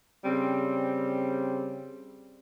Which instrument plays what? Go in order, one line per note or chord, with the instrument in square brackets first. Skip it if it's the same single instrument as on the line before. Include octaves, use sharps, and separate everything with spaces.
[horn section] C#3 G3 C4